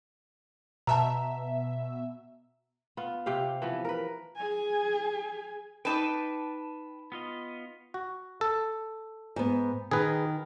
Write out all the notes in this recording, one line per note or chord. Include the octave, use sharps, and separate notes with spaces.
B2 E5 A5 A#5
B3 F4
C3 G4 F5
E3 F3 B3
A#4 B4
G#4 G#5
D#4 B4 G5 A5 D6
B3 F4 D#5
F#4
A4
G#2 B3
D#3 G#4 B4